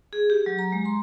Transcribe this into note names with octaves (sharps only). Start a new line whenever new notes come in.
G#4
G4
F#3
A#5
G#3
C6